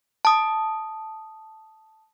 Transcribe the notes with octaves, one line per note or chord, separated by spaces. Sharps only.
A5 D#6